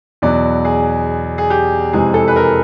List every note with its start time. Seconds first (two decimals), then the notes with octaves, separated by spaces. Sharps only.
0.22 E2 B2 F#3 D5
0.65 G#4
1.38 G#4
1.50 G4
1.93 F2 C3 E3 G#3 G#4
2.14 A4
2.28 B4
2.36 A#4